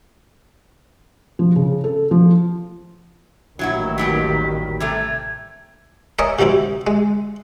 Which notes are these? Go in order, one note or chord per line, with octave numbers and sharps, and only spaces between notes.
F3
C#3
A4
F3
A1 D#2 D#3 F#3 E4 F#4
F#3 G3 G4 B6
C3 G3 A3 G#6
A#4 C#5 D#5 E5 G#5
C3 D#3 F#3 C4 E4
G#3